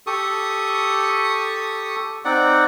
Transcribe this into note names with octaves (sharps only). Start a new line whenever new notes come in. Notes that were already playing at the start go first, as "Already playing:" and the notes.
G4 A4 C#6 D#6
C4 D#4 D5 F#5